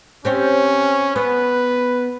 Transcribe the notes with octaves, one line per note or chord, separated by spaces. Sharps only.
C4 C#4 G4 C#5
B3 B4